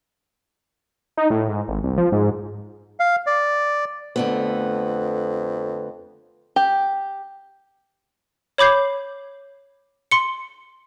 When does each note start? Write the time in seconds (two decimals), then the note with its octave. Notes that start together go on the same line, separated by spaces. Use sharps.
1.17 D#4
1.30 A2
1.49 G#2
1.68 G#1
1.84 C2
1.98 F3
2.12 G#2
3.00 F5
3.27 D5
4.16 F2 D3 A3 B3
6.56 G4
8.58 C#5 B5 D6 G6 C7
10.11 C6 C#7